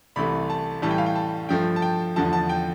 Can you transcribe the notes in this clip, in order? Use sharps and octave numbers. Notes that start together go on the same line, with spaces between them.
C2 C3 E3 A3 B5
A5
A2 E3 G3 A5
G5
F5
G5
A5
G2 F3 A3 G5
A5
G5
E2 D3 F3 A3 A5
A5
G5